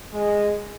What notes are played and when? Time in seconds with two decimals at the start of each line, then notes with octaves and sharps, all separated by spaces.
0.12 G#3